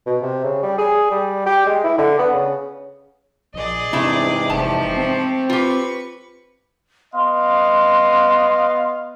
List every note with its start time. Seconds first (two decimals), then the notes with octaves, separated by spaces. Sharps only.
0.07 B2
0.22 C3
0.44 C#3
0.63 G3
0.78 G#4
1.11 G3
1.46 G4
1.67 G#3
1.84 E4
1.98 D3
2.19 B3
2.34 C#3
3.54 A#1 G#4 D5 D#5
3.93 E2 G#2 C3 A3 D4 E4
4.50 F1 F3 A3 G4 A5
4.97 C4
5.50 F4 G4 B4 C#6
7.14 B3 D#5 F5 C6